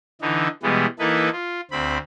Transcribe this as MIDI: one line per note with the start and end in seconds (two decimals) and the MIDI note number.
0.21 0.48 50
0.21 0.48 52
0.21 0.48 63
0.63 0.86 47
0.63 0.86 52
0.63 0.86 55
0.63 0.86 56
0.63 0.86 59
0.99 1.29 52
0.99 1.29 58
0.99 1.29 63
0.99 1.29 64
0.99 1.29 69
0.99 1.29 71
1.32 1.61 65
1.71 1.98 38
1.71 1.98 60
1.71 1.98 83